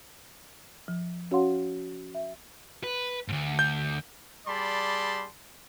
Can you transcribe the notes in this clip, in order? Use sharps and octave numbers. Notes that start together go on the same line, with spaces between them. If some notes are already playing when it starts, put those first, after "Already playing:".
F3
C#4 F#4 C#5 F5 F#5 C6
E5
B4
D2 G#2
G6
G3 G#4 D5 A5 B5 C6